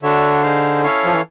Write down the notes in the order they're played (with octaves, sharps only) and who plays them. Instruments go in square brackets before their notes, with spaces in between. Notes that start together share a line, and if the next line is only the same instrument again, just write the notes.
[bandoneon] D3 [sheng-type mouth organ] D4 F#4 A4 C#5 E5
[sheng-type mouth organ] D#4 G#4 C5 F5
C#4 E4 A4 C#5 F5
[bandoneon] F3
E3